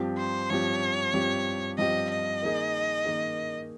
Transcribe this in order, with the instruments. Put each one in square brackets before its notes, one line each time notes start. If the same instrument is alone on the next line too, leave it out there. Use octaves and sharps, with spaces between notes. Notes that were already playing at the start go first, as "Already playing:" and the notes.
Already playing: [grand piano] G2 F3 C4 G4
[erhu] C5
[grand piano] G2 F3 C4 G4 [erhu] C#5
[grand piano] G2 F3 C4 G4
[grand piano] G2 F3 C4 G4 [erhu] D#5
[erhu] D#5
[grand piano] D#3 A#3 D#4 G#4
D#3 A#3 D#4 G#4